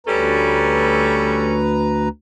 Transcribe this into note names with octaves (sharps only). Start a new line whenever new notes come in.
D2 G3 C#4 A4 B4 A#5